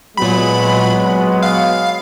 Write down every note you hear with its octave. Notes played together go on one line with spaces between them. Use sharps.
A#2 F#3 G#3 B3 B5
F5